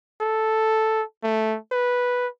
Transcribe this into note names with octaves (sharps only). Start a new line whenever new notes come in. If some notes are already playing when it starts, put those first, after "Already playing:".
A4
A3
B4